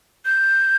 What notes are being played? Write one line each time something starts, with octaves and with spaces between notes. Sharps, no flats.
G6